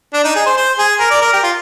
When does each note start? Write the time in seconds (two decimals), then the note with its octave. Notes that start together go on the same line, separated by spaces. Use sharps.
0.14 D4
0.24 D#4
0.36 G#4
0.46 C5
0.57 C5
0.79 G#4
1.00 A#4
1.11 D5
1.22 A#4
1.33 G4
1.44 F4